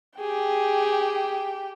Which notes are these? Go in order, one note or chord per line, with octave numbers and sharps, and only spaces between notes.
G4 G#4 G5